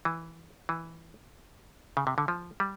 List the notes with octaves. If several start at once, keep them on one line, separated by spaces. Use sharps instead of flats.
E3
E3
C#3
C3
D3
F3
G3